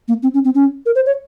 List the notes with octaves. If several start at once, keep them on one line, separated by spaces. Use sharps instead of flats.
A#3
C4
C#4
C4
C#4
A#4
C5
C#5